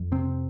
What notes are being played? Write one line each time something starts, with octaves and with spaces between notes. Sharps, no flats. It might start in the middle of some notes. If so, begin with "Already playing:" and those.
Already playing: F2
C3 C4